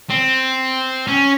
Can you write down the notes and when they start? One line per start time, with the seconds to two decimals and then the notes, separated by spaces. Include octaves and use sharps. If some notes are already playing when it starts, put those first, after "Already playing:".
0.10 C4
1.07 C#4